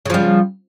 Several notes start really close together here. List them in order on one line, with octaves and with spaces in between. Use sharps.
C#3 F3 G3